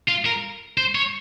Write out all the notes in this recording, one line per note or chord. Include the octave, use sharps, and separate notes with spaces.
F4
A#4
C5
C#5